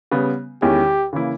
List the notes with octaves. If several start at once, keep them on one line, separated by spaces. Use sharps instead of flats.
C#3 G3 B3
E2 D#3 G#3 C#4 E4 G4
C#3 E3 A#3 E4